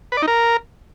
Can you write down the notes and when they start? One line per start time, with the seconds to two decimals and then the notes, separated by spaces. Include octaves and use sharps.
0.12 B4
0.17 D5
0.22 D#4
0.27 A#4